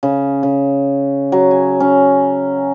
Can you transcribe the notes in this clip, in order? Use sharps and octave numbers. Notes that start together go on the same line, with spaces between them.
C#3
C#3
F#3
G#5
C#4